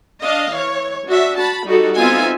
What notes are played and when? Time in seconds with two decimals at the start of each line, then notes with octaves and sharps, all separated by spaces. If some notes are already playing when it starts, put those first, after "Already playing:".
0.22 D4 D#5 F5
0.53 E3 C#5
1.06 D4 F#4 E5
1.37 F#4 A5 B5
1.65 G3 D#4 F#4 A4
1.98 B3 C4 D#4 F4 E5 G#5